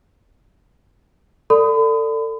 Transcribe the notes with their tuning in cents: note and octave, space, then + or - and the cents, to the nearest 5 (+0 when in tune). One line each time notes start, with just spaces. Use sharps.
A4 +30 D5 +0 B5 +40